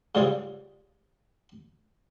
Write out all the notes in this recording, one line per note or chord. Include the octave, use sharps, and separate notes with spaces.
G#2 C#3 G3 F4 G#4 G5